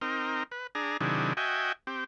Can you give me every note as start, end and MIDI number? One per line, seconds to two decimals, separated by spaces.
0.01 0.43 60
0.01 0.43 63
0.01 0.43 70
0.51 0.67 71
0.75 0.97 62
0.75 0.97 68
0.75 0.97 82
1.01 1.33 48
1.01 1.33 51
1.01 1.33 54
1.01 1.33 62
1.01 1.33 64
1.01 1.33 68
1.37 1.72 66
1.37 1.72 75
1.37 1.72 76
1.37 1.72 79
1.37 1.72 80
1.87 2.04 60
1.87 2.04 67